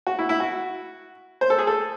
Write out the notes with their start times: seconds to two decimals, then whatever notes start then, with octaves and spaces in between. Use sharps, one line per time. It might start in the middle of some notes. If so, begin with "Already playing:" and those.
0.07 F#4
0.19 E4
0.29 E4
0.40 F#4
1.41 C5
1.50 A4
1.59 G#4
1.67 A4